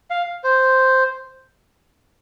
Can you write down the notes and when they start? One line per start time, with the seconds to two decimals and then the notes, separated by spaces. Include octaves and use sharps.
0.10 F5
0.44 C5